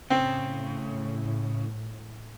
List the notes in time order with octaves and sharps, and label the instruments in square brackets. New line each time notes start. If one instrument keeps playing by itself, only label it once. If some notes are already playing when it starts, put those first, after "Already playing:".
[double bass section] A2 [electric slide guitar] C#3 [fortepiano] C4